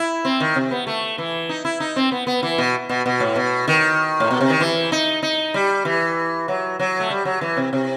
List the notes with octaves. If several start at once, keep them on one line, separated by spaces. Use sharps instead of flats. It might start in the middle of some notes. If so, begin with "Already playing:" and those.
Already playing: E4
C4
D#3
C3
B3
A3
E3
D#4
E4
D#4
C4
B3
B3
E3
B2
B2
B2
A2
B2
D#3
A2
B2
C3
D#3
E3
D#4
D#4
G3
E3
F#3
F#3
A3
G3
F#3
E3
C3
C3